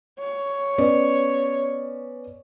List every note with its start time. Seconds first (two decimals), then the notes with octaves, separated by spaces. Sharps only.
0.20 C#5
0.78 B3 C#4 D5